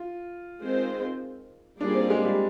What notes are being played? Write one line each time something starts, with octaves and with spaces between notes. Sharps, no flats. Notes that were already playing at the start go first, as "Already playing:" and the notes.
Already playing: F4
D#3 G#3 C4 F4 C5
G3 A#3 D4 F4 G#4 D5
C4
G#3
G3